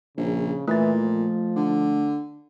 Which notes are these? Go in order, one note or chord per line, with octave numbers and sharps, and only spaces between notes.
A#1 C#3
A#2 E3 A3 A6
F3
D3